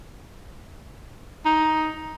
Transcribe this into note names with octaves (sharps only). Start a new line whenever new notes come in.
D#4